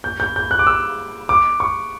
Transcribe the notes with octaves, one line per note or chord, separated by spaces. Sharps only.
G6
G6
G6
F#6
D6
E6
D6
C#6